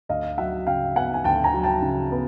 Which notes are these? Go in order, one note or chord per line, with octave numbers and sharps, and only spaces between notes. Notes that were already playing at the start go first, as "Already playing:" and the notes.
D2 D#5 F5
F#3 E5 F#5
C#3 F5 G5
B3 F#5 G#5
G#5
D2 G5 A5
G#5 A#5
F#3
G5 A5
C#3
B3